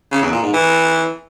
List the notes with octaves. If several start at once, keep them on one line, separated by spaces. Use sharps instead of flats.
C#3
E2
A#2
G#2
E3